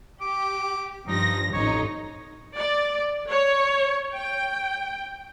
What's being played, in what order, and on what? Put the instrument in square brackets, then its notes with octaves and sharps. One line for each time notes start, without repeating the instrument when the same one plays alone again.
[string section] G4 [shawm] D6
[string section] G2 F3 A#6 [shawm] D#4
[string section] A1 F2 D#4 [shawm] C#5
[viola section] D5
C#5
G5